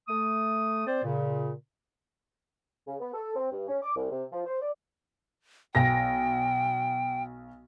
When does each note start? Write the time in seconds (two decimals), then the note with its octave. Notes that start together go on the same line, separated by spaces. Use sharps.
0.08 A3 D#6
0.86 C4 C5 D5
1.03 A#2 C#3
2.87 C#3
3.00 B3
3.13 A4
3.36 C4
3.52 G2
3.68 C#4
3.82 D6
3.96 C2
4.11 C3
4.31 F3
4.45 C5
4.61 D5
5.75 B1 G5 A#6